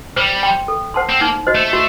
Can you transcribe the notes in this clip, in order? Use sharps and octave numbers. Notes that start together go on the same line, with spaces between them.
G3 C5
G5 C6
A4
C5 F#5 A5 C6
C4
A#3 D#4
F#4 C5 D#5
A3
F#4